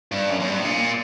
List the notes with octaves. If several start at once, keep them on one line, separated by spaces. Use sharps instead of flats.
G2
F#2
F#2
G2
A2
A#2